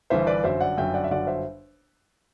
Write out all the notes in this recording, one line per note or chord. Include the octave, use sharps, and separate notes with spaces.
G1 G2 E3 C5 E5
B4 D5
G1 F#2 F#3 C5 E5
D5 F#5
G1 F#2 F#3 E5 G5
D5 F#5
E5
G1 F#2 F#3 D5 F#5
C5 E5